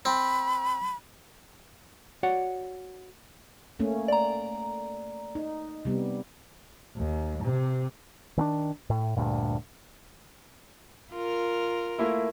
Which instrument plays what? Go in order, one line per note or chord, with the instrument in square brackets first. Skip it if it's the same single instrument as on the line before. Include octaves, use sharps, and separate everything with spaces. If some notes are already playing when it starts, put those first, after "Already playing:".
[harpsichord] C4 [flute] B5
[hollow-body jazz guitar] F#4 C#5 D5 F#5
[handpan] A3 A#3 C#4
[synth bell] D5 A#5
[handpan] D#4
C3 G3 B3
[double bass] D#2
C3
[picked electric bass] D#3 C4 D4
A2
D2 G2 A#2
[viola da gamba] F4 A#4
[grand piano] A3 A#3 E4